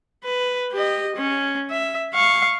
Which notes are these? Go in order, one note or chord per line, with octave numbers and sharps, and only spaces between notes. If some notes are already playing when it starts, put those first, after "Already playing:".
B4
G4 D#5
C#4
E5
F5 C#6